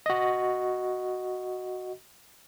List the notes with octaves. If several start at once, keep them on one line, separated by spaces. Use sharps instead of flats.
F#4 D#5